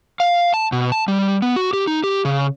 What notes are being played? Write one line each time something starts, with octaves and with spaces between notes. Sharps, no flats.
F5
A5
B2
A5
G3
B3
F#4
G4
D#4
G4
C#3